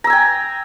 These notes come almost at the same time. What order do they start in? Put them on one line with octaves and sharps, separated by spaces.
A#5 E6 G#5 G5